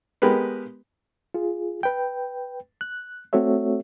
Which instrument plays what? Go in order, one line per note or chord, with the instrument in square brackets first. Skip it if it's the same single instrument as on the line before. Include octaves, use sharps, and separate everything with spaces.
[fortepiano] G#3 B3 G4 A#4 B4
[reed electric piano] F4 G#4
B4 G5
F#6
A3 C4 F#4 A4 C#5 E5